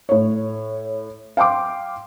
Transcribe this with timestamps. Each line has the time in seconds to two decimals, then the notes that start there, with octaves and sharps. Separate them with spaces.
0.09 A2 C#5
1.37 F5 G5 C6 D6